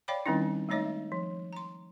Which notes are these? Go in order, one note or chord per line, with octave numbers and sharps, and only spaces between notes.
C#5 D5 F5 G5 B5 D6
D#3 G3 C4 C#4 D#4 E4
G#3 A3 D#4 C#5 D#5
F3
A#5 C6